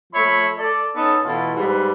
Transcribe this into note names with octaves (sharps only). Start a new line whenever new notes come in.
F3 A3 C#5 E5 B5
A4 D5
B3 C#4 D#4 A4
B2 E3 A3 E4 F4 A4
G#2 G3 B4